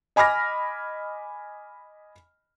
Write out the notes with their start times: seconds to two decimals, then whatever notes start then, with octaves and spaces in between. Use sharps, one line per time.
0.16 D#5 G#5 B5 D6 F6 A#6